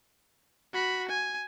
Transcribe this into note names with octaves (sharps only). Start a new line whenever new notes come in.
F#4 B5
G#5